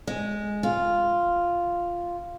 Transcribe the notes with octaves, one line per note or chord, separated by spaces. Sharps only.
G#3
F4